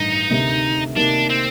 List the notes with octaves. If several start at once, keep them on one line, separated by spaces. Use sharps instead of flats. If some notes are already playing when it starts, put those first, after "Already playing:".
Already playing: A1 G2 D#3 D#4
D2 C3 D#3
C3 D#3 A#3 D4 D#4
C4